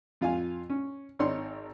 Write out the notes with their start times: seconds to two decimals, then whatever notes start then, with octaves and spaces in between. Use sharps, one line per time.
0.21 F2 F4 F5 G#5
0.70 C#4
1.19 G#1 D#4 C#5 D5 C6